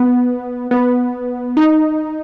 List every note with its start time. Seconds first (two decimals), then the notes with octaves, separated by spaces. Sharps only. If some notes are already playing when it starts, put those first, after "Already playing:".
Already playing: B3
0.71 B3
1.57 D#4